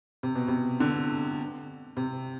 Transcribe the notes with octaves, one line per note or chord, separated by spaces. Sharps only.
C3
B2
C3
D3
C3